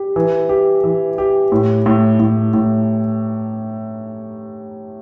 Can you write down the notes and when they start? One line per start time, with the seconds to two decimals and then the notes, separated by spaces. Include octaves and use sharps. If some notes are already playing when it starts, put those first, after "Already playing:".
Already playing: G4
0.16 E3
0.49 G4
0.84 E3
1.18 G4
1.52 A2
1.86 A2
2.20 A2
2.54 A2